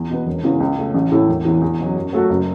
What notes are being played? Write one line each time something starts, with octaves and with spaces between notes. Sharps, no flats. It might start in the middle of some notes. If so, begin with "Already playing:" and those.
Already playing: E2
B2 B3
E1
E2 C#3 E3 B3
C#2
C#3 A3
A1
A2 E3 A3 E4
E1
E2 E3
E2
B2 F#3
F#2
F#3 A3 F#4
F#1